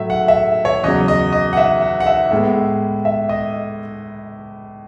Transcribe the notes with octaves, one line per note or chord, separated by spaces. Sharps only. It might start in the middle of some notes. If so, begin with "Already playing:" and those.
Already playing: A2 F#3 A3 E5
F#5
E5
C#5
E2 C#3 F#3 D#5
D#5
D#5
F#5
E5
F#5
F#5
E5
A2 G#3 B3
E5
D#5